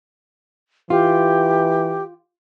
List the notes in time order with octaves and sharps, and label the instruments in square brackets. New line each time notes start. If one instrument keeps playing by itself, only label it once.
[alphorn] E3 [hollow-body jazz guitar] F4 [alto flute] G4